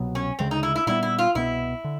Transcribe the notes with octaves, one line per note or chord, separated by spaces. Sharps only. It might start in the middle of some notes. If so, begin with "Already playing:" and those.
Already playing: C2 B2 F#3 B3
C#4
D2 C#3 F3 G#3 C4
D#4
E4
E4
A#2 G3 B3 E4
E4
F4
C2 B2 G3 B3 E4
D3